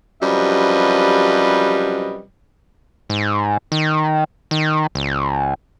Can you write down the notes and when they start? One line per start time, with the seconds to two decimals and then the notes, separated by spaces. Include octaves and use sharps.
0.23 F#2 C3 F3 G3 B4 D#5
3.10 G#2
3.72 D#3
4.51 D#3
4.95 C#2